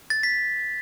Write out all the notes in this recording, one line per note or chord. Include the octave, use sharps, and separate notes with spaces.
A6
B6